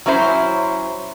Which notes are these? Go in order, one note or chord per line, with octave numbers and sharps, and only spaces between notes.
F#3 C#4 E4 C5